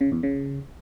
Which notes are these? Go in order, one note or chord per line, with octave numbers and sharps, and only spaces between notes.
C#3
E2
C#3